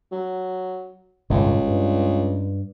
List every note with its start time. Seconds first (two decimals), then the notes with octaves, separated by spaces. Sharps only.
0.12 F#3
1.30 G1 C#2 A2 C3
1.67 G2